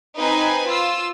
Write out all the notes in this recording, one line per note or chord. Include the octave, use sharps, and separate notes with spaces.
C4 D#4 B4 G#5
F4 E6